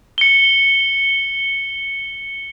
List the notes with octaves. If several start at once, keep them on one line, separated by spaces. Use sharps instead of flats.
C#7 G7